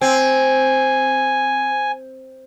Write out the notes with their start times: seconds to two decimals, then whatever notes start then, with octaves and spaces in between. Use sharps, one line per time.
0.01 C4 G#5